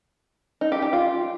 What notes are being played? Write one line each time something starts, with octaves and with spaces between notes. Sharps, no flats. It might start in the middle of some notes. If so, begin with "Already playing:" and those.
D#4
G4
G4
F4